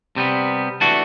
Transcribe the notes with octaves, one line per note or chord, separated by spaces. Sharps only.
C3 G3 B3
E3 A3 D4 F#4